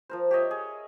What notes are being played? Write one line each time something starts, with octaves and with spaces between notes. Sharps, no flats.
F3 A#4 C5
G4 C#5 D#5 E5
G#4